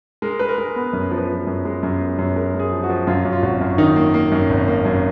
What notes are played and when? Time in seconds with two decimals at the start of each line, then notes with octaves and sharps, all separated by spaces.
0.22 G#3 A#4
0.39 G#3 B4
0.49 A#4
0.58 G#3 G#4
0.76 B3
0.93 F#2 A#4
1.11 F3
1.18 B4
1.29 F3
1.47 F#2
1.65 G#3
1.83 F#2
2.00 B3
2.19 F#2
2.36 G#3 A#4
2.54 G#3
2.59 G#4
2.72 F3
2.84 F#4
2.90 F3
3.07 F#2 F4
3.25 F#2
3.33 F4
3.42 G#1 F#4
3.61 F#2
3.78 D#3 D#4
3.96 A#3
4.14 A#3
4.32 F#2
4.49 G#1
4.68 A#3
4.85 F#2